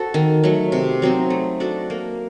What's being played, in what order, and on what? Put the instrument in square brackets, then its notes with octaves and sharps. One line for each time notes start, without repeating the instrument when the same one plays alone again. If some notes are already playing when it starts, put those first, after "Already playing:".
Already playing: [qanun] C4 F#4 A4
D#3
F#3 A3
C3
F#3 C4 D#4
A3
D4 F#4 A4
A#3